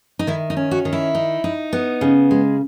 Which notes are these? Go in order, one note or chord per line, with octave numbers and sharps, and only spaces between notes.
D#4
D#3 E4
D#4
C#4
F#4
D#3
E4
D#4
D#4
B3
C#3
G#3